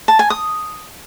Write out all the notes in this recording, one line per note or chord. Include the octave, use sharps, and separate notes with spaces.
A5
G#5
D#6